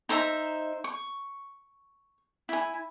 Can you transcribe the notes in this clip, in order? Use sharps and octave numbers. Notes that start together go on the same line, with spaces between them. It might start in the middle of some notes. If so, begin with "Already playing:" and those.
D#4 C5 E5 A#5
C#6
E4 G#5